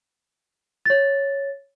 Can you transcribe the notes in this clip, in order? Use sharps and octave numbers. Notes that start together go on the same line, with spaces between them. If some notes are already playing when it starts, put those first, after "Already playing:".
C#5 A6